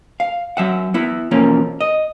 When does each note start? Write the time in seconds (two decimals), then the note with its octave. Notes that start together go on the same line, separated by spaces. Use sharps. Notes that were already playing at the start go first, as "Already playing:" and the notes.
0.20 F5
0.57 F#3 E5 F#5
0.94 B3 E4
1.31 B2 E3 F3 A#3 C#4
1.81 D#5